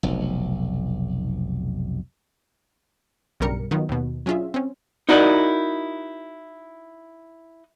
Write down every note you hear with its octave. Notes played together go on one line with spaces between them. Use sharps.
F1 B1
B1 G2 C#3 G3 A#4 C#7
D#3 F#3 B3 D#4 F4
D#2 B2
F#3 C#4 D4 F4 G#4 E5
C4 C#4
D#4 E4 F#4 A#4 D5 D#5